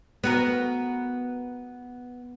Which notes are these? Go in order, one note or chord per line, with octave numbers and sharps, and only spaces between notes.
B3 F#4 A#4